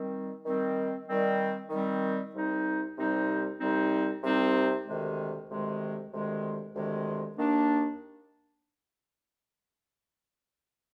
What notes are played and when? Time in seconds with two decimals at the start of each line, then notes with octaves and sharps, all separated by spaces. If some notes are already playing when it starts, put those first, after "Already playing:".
Already playing: D#3 G3 C4
0.44 D#3 G3 C4
1.07 D#3 G3 C4
1.70 D#3 G3 C4
2.33 C2 C3 G3 C4 D#4
2.97 C2 C3 G3 C4 D#4
3.60 C2 C3 G3 C4 D#4
4.23 C2 C3 G3 C4 D#4
4.85 D2 C3 D#3 G#3
5.49 D2 C3 D#3 G#3
6.11 D2 C3 D#3 G#3
6.74 D2 C3 D#3 G#3
7.38 D#2 D#3 A#3 D4